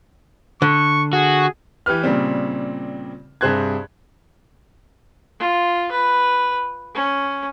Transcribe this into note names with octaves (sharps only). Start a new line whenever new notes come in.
D3 C#6
F#4 G#4
E3 G4 B4 F6
A#2 C#3 G3 C4
G2 C3 G#4 C5 F#6 G#6
F4
B4
C#4